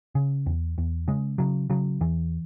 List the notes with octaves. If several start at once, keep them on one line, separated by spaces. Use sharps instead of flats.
C#3
E2
E2
C#3 G#3
C#3 F#3
C#3 F#3
E2 E3